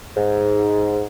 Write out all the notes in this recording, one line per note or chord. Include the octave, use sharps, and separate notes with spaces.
G#2